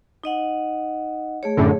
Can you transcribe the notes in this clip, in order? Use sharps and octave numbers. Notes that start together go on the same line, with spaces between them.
D#4 D#5 F#5
A3 G#4 C#5
F#2 A2 D3